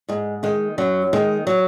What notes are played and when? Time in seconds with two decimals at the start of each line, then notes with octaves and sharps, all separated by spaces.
0.09 G#2 G#3
0.43 D#3 G#3
0.78 F#2 F#3
1.13 D#3 G#3
1.47 F#3